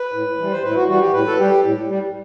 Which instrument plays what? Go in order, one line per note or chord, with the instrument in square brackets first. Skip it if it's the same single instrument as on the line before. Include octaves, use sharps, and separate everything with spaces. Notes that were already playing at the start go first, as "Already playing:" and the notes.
Already playing: [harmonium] B4
A2
E3 G3
C5
A2 B4
E4
F#4
E3 G3 F#4
G4
A2 B4
A4
G3 G4
A2
G3